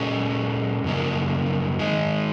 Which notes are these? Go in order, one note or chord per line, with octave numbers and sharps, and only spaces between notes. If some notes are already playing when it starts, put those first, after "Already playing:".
Already playing: A#2 G#3 C#4
F#2 C#3 F3 A#3
D#3 G#3 D#4